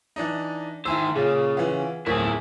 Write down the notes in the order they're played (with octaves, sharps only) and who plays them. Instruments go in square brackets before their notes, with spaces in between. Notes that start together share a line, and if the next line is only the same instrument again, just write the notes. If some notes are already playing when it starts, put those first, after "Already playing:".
[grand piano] E3 D4 D#4
[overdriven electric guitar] D#3 C5 [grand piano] E4 G#5 E6
[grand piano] A#2 C#4 F4 [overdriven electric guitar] C#3 [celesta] G#4
[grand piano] E3 F4 [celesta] B4 F5 F#5
[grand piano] D1 A2 C4 [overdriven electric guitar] E4 G#4 [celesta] A#4 G#5